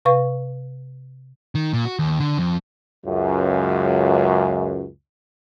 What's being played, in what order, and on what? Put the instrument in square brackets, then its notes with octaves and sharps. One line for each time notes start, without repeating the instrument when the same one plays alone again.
[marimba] C3 B4 F5 C#6
[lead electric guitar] D#3
A#2
F#4
D#2
D3
F2
[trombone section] C#2 F#2